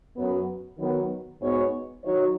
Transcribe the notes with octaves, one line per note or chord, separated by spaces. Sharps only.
F#2 F#3 B3
D#3 F#3 B3
G#2 G#3 B3 F#4 C#5
D#3 F#3 D#4 F#4 C#5